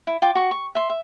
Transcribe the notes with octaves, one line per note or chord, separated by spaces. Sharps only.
E4
F4 G5 D6
F#4 C#6
C#6
E5 C6
E5